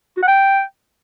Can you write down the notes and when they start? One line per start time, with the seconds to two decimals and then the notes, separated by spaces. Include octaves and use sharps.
0.17 F#4
0.23 F#5
0.28 G5